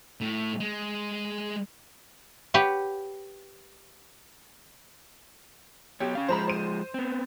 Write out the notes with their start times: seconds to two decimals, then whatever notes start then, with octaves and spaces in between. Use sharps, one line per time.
0.21 A2
0.60 G#3
2.54 G4 B4 C#5 F#5
6.00 F#3 B3 G4 C#5
6.15 C#4 F5
6.28 F3 G#3 C5 A#5 B5
6.47 C5 D#7
6.94 B3 C4